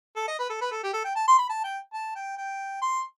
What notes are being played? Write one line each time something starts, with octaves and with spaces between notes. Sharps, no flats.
A4
D#5
B4
A4
B4
A4
G4
A4
G5
A5
C6
B5
A5
G5
A5
G5
G5
C6